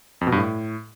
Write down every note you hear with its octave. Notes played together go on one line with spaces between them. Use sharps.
F2
B2
G2
A2